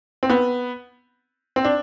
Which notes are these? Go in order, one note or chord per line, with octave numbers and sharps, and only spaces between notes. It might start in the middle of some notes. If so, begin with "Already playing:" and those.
C4
B3
C4
D4